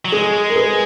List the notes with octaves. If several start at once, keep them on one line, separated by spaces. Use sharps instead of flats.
F#3
G#3 G#4
A#4
G#4 B4